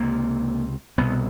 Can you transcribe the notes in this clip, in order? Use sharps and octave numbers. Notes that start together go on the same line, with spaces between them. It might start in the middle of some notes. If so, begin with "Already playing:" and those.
Already playing: C#2 C3 A#3
C2 B2 B3